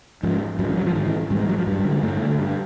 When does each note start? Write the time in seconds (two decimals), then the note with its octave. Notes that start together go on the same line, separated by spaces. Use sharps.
0.23 G#2 F3
0.59 G#2 F#3
0.68 E3
0.77 F#3
0.86 F3
0.95 G#2 D#3
1.07 E3
1.30 G#2 G3
1.40 G#3
1.49 F#3
1.58 F3
1.67 G2 G3
1.79 G3
1.85 D3
1.92 G#3
2.03 G2 A3
2.22 D3
2.39 G2